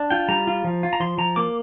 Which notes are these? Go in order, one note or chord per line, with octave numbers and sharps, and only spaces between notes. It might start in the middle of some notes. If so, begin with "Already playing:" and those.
Already playing: D4
F4 G5
G3 A#5
F4
F3
F4
A#5
F3 C6
F3 A#5
A#3 D6